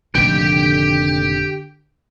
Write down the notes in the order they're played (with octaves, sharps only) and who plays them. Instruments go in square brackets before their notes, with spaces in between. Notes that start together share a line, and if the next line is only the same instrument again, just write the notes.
[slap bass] F1 A#2 D#3 [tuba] D3 [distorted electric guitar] G4 G5